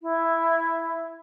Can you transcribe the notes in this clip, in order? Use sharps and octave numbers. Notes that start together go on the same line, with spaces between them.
E4